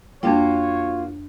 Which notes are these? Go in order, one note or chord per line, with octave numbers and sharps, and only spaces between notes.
F2 A#3 D4 F4 F#4 C#5 G5